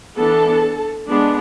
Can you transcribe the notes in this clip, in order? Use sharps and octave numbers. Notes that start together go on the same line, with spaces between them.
E3 B3 D4 A4 A5
G#3 B3 D4